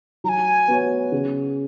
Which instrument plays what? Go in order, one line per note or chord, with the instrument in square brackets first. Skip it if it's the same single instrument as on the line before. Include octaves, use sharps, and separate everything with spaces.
[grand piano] F#3 [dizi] A#5
[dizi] G#5
[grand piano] B3 F#4 C#5
C#3